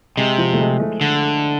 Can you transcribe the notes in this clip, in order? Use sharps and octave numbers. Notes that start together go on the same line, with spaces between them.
C3 G#3
F3
A3
G#3
A3
D3